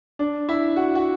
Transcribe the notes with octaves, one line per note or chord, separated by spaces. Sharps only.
D4
E4
F#4
F#4